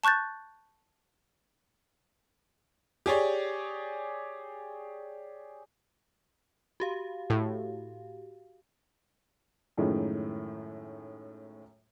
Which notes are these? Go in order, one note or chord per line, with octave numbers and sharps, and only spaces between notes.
A5 C#6 F#6 G6 A6
G4 G#4 C#5 D5
F#4 G4 F5
A2
F#2 A2 D#3 F3 G#3